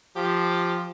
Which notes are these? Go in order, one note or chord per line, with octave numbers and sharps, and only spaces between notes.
F3 G4